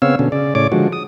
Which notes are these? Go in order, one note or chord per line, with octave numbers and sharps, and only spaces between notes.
C#3 B3 C4 C#5 F5 E6
B2 D3 C#4
C#3 D5
A2 C#3 C#5 D5 D6
D3 F3 G#3 F#4
D#6